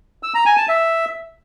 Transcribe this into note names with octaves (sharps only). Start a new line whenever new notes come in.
E6
A#5
G#5
A5
E5